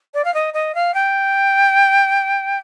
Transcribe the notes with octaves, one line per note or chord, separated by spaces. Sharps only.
D5
F5
D#5
D#5
F5
G5